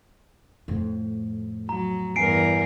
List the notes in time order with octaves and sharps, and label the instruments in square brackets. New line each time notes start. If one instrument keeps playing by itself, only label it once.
[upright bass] F2 A2
[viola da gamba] F#3 [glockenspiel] A#5
[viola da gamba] E2 G2 A#4 [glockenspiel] G#5 C7 D7